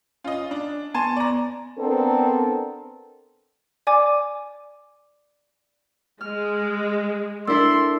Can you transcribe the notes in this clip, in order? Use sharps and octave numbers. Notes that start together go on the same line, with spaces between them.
C#4 F4 D#5
D4
B3 G#5 A5 C6 C#6
D5 A#5
B3 C4 D4 A4 A#4
D5 G#5 D6
G#3 F6
D4 E4 A4 A#4 C6 E6